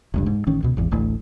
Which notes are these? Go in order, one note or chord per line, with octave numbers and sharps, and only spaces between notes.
F1 C#2 G2
G#2
A1 D#3 C#4
C#2 B2
G#1 E2
D1 A1 D2 A2